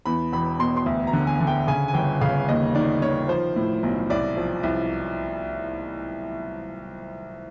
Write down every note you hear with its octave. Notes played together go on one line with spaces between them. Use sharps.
E2 B5
E1 B5
B2 C6
C6
D2
A#5
D3
G#5
D3
G5
C#3 G#5
G#5
G1 G5
C#3 F5
D#2 D#5
D#3 D5
D#3 C#5
F3 C5
A2
B1
C2 D5
F3
C2